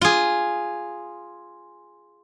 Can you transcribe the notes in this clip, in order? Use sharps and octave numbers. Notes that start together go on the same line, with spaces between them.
F4 G#4